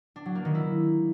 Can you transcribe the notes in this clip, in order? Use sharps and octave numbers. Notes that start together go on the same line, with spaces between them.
D4
F#3
A#3
D#3
E4